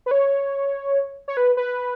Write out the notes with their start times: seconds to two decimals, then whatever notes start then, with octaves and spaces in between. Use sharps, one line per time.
0.06 B4
0.11 C#5
1.28 C#5
1.37 B4
1.57 B4